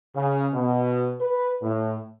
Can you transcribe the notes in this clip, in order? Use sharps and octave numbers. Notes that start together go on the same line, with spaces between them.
C#3
B2
B4
A2